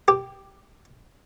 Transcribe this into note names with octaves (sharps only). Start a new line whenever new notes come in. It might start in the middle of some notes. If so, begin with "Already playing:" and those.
G4